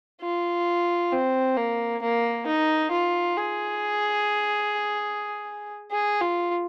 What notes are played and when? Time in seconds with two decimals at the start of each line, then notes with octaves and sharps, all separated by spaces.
0.22 F4
1.12 C4
1.57 A#3
2.02 A#3
2.47 D#4
2.91 F4
3.37 G#4
5.91 G#4
6.21 F4